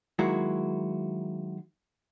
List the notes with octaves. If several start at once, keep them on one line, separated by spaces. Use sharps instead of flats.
D#3 F#3 G#3 A#3 E4 F#4